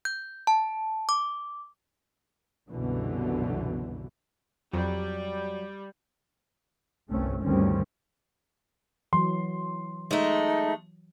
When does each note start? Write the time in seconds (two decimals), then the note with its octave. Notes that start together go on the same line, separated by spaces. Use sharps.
0.05 G6
0.47 A5
1.09 D6
2.69 C2 F#2 B2 D3 E3
4.73 F2 F#3 G3
7.09 G1 C2 G2 A3 C4 C#4
7.43 D2 G2 D#3 G3 C4 C#4
9.13 E3 F#3 C6
10.11 G#3 A3 D#4